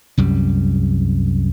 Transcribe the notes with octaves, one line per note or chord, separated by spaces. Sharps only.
C2 F#2 G3